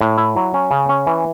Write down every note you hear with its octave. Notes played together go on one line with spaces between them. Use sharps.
A2
E4
F#3
C#4
C#3
C#4
E3